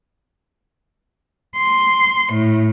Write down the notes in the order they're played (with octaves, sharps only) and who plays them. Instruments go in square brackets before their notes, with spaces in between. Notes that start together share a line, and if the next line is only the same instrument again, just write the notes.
[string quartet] C6
A2